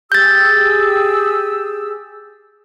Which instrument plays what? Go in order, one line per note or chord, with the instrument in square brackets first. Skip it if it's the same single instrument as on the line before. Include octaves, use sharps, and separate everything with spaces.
[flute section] G4 G#4 E6 [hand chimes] G6 A6